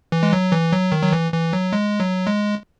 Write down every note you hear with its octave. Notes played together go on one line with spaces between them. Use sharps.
E3
G#3
F#3
E3
F#3
D#3
F#3
E3
E3
F#3
G#3
F#3
G#3